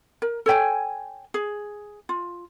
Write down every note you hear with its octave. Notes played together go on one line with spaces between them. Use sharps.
A#4
A4 C#5 G5 G#5
G#4
F4